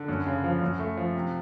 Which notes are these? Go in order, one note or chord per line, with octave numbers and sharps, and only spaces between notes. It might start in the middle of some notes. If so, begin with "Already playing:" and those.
Already playing: D3
F#2
C#3
F3
F#2
A3
F3
C3